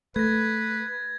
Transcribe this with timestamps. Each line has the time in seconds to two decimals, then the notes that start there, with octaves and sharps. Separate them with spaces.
0.16 A3 B4 G#6 A#6